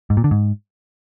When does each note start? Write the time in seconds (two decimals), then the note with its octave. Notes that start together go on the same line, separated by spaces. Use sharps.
0.10 G#2
0.17 A#2
0.24 D3
0.31 G#2